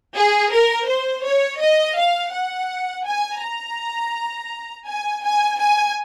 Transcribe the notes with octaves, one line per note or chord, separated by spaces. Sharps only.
G#4
A#4
C5
C#5
D#5
F5
F#5
G#5
A#5
G#5
G#5
G#5